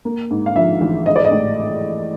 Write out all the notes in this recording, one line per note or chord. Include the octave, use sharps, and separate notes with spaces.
A#3
G#2
F5
F3 E5
A1
G#3 D#5
D5
D#5
A2